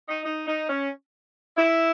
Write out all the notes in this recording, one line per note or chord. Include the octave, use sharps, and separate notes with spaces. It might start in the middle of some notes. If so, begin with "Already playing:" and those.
D#4
D#4
D#4
C#4
E4